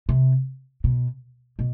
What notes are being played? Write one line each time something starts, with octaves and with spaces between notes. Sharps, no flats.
C3
B2
B2